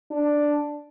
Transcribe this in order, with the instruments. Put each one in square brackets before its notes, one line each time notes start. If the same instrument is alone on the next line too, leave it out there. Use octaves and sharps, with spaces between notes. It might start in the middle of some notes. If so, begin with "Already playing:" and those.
[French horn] D4